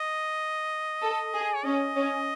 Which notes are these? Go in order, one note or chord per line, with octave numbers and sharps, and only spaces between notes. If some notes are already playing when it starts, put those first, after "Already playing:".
Already playing: D#5
A4
G#4
C#5
C#4 D#5
C#4